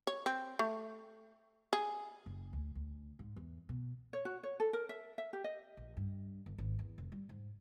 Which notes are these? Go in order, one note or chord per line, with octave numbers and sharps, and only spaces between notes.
C#5
C4
A3
G#4
F#1
D2
D2
G#2
E2
B2
C#5
F#4
C#5
A4
A#4
E5
E5
G4
D#5
A#1
G2
G1
G#1
E2
F1
G3
G#2